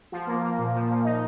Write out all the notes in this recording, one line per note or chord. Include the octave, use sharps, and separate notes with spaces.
F3
A#3
A#3
A#2
F3
A#2
D#4